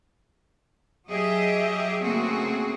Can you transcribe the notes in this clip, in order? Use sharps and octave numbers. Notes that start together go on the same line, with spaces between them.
F#3 G4 G#4 D#5 E5
C#3 A3 A#3 C4 F#4 G#4